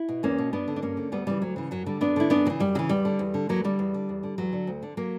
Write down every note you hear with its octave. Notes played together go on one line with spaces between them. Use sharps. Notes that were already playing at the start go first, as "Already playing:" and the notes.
Already playing: E4
B2
E2 A#3 C#4
B2
G2 B3 D4
D3
D4
G2 A#3 C#4
D3
D2 G3 B3
C#3 E3 G3
D2 F#3
C#3 E3
F#2 F#3
D3 G3
F#2 B3 D4
D3 E4
F#2 B3 D4
C#3 E3 F#3
F#2 G3
C#3 E3 F#3
E2 G3
D3
E2
D3
E2 F#3 A#3
D3 G3
E2
D3
E2
D3
E2 F#3
D3
D2
D3
F#3 A#3